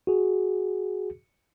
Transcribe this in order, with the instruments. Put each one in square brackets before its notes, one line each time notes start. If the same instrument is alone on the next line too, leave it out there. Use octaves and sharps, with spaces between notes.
[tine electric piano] F#4 G#4